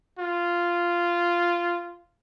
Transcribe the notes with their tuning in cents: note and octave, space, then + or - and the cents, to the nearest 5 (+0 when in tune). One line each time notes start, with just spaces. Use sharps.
F4 -10